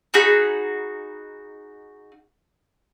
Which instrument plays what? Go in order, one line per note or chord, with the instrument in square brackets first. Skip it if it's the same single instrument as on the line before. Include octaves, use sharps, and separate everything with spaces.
[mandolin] D#4 F#4 G#4 B5